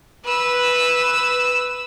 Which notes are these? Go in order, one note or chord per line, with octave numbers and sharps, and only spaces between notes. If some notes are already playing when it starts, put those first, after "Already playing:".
B4 E6